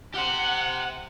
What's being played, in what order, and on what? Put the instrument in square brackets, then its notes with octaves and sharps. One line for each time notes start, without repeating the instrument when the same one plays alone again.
[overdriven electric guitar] G4 C5 [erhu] F#5